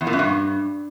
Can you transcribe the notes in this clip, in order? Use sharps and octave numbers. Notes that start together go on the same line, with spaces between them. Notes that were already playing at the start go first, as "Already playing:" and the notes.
E2
A#2
F#2
G2